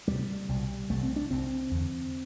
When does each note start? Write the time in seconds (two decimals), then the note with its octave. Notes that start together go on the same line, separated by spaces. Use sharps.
0.07 D2 C3 G3
0.49 C2 B2
0.90 C2 C3 A3
1.03 C4
1.16 D4
1.30 C2 C3 C4
1.71 E2 D3